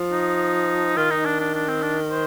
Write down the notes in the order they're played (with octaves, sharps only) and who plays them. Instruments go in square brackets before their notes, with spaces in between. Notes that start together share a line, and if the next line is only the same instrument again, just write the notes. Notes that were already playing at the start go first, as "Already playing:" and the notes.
Already playing: [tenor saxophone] F3
[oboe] D#4
[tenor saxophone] D#3 [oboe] F4
[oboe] D#4
D4
D4
D4
C4
D4
C5